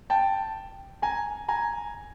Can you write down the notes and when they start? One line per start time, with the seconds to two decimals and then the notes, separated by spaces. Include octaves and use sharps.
0.10 G5 A5
1.02 G#5 A#5
1.48 G#5 A#5